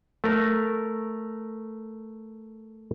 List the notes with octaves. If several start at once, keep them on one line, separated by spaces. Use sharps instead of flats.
A3 A#4